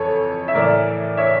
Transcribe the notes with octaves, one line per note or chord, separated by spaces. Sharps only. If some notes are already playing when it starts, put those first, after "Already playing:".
Already playing: F2 E3 A4 C#5
E5
A2 E3 A#4 D5
C#5 E5